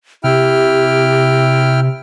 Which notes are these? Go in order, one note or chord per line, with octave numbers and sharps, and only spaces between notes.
C3 E4 G4 G5 F6